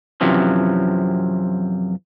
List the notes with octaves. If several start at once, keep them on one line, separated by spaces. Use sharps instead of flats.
F#2 C3 E3 F3